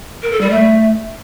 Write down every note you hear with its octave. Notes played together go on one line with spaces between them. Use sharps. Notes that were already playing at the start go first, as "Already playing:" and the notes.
A#4
A4
G3
A3